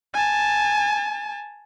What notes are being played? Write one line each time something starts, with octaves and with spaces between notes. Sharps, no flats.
G#5 A5